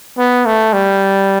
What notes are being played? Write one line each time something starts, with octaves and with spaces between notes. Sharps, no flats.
B3
A3
G3